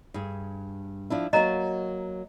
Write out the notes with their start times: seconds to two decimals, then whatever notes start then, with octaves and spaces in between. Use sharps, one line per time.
0.14 G2 G#4
1.10 F3 D4 E4
1.33 F#3 A#3 F#4 D#5 A#5